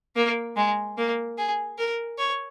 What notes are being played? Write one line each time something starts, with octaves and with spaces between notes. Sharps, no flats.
A#3
G#3
A#3
G#4
A#4
C#5